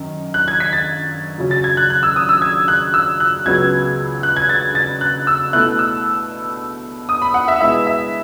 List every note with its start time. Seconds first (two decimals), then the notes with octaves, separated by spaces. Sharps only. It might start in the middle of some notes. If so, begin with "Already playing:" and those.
Already playing: F#2 D#3
0.34 F#6
0.48 G#6
0.60 B6
0.73 A6
1.38 F#2 C#3 F#3 C#4
1.51 A6
1.64 G#6
1.77 F#6
1.90 F#6
2.03 E6
2.16 D#6
2.29 E6
2.42 G#6
2.68 F#6
2.94 E6
3.20 F#6
3.46 C#2 C#3 F#3 B3 G#6
4.23 F#6
4.36 G#6
4.49 A6
4.75 A6
5.01 F#6
5.27 E6
5.53 B2 A3 E4 F#6
5.79 E6
7.09 D#6
7.22 B5
7.34 F#5
7.48 E5
7.60 B2 G#3 B3 E4 E5
7.87 E5